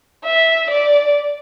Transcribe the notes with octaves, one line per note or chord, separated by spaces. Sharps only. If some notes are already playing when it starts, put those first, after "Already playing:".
E5
D5